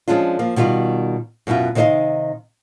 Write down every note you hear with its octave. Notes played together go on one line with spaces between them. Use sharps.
F3 G#3 C#4 D4 F4
F3 A#3
B2 D#3 G3 F4
F#2 B2 C#4 E4 F4
C3 D#3 D#4 C5 D#5 F5